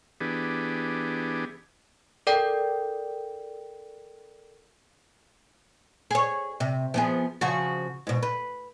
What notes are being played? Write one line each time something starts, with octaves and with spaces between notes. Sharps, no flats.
E3 B3 D4 G4 G#4
A4 A#4 D5 G5
G#4 C#5
C3
F3 B3 G#4
C#3 F3 F#4
G#2 B2
B4